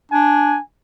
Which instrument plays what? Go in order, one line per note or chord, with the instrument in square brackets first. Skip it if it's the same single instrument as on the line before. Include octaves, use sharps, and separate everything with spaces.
[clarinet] D4 [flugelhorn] G#5